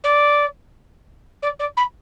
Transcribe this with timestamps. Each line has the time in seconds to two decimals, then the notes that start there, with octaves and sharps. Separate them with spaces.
0.03 D5
1.42 D5
1.59 D5
1.77 B5